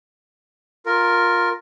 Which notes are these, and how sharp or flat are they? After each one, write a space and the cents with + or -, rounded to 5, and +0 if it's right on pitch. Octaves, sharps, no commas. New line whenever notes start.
F4 +15 A#4 +0